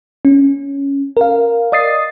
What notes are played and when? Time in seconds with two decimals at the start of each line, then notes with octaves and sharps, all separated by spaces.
0.25 C#4
1.17 A#4 F5
1.72 D5 D#5 D#6 A6 C7